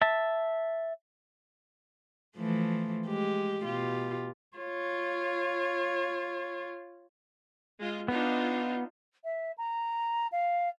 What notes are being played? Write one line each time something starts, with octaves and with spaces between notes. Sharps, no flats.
E5 A5
E3 F3 A3
G#3 G4
B2 F4 G4
F4 C#5
G#3 F4
B3 D4 D#4 F4
E5
A#5
F5